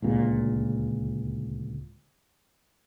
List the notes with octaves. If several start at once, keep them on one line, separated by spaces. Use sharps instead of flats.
D1 C#2 A#2